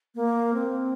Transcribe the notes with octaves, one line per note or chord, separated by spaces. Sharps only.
A#3
C4